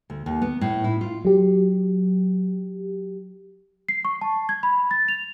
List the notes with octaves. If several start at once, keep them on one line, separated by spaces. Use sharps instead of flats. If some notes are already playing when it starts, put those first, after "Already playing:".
D2
D#2
B3
A2
E4
F4
F#3 G4
C7
C#6
A5
G#6
B5
A6
F7